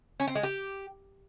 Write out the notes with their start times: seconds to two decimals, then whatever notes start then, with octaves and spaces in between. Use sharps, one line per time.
0.20 C#4
0.28 C4
0.35 G#3
0.43 G4